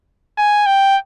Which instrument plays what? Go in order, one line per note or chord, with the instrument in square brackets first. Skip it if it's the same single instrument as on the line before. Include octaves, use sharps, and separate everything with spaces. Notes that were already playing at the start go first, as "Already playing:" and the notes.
[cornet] G#5
G5